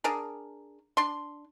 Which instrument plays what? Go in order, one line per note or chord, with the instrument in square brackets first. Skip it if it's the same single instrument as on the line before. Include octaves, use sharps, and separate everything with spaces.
[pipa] D4 G#4 A#4
D4 C6